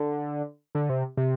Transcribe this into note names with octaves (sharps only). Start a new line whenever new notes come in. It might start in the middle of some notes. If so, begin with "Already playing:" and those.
Already playing: D3
D3
C3
C3